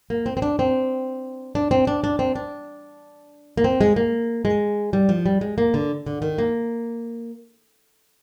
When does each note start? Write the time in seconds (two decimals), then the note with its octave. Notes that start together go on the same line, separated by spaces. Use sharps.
0.10 A#3
0.26 C4
0.37 C4
0.42 D4
0.59 C4
1.55 D4
1.71 C4
1.87 D4
2.04 D4
2.19 C4
2.35 D4
3.57 A#3
3.64 C4
3.81 G#3
3.96 A#3
4.45 G#3
4.93 G3
5.09 F3
5.26 G3
5.41 G#3
5.58 A#3
5.74 D3
6.06 D3
6.22 D#3
6.38 A#3